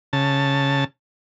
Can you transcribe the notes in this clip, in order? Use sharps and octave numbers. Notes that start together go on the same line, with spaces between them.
C#3 A5